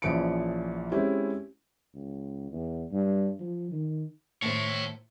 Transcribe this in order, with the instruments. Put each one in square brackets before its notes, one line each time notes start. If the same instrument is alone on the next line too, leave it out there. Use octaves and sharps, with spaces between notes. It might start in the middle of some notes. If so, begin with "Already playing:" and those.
[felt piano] A#1 E3 F3 C#4 C#7 D7
G#3 C4 C#4 E4 G4
[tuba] C#2
E2
G2
F3
D#3
[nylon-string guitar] A2 D#3 C5 [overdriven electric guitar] C#5 A5